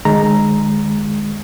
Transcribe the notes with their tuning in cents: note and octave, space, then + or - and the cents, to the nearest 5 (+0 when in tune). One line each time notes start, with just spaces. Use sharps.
D#3 -40 G#3 +0 A#5 +0